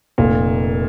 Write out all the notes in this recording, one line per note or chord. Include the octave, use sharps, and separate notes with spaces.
F1 A#2